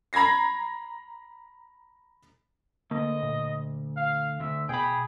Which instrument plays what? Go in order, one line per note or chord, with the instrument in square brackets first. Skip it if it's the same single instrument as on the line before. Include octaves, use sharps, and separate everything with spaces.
[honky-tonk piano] A#5 B5 G#6 A#6 C7
[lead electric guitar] D2 [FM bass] A#3 [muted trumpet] D#5
[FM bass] A#2
[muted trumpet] F5
[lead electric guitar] D2 [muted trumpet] E5
[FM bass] B2 [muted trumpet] G#4 [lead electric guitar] G5 B5